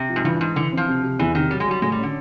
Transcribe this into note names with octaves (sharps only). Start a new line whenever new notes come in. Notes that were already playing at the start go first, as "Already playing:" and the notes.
Already playing: C3
F3
G#2
G2 E3
G#2 E3
D3 E3
F3 C4
C3
C3
E2 E3
C3 D#3
F#3 G3
G#3
F#3 G3
A2 G#3
G3
D3 C#4